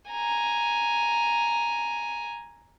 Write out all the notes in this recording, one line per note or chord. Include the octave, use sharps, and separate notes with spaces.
G#5 A#5